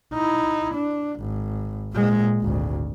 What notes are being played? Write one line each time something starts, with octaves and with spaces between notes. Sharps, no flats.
D#4 E4
D4
G#1
A#2 G#3
G#1 D2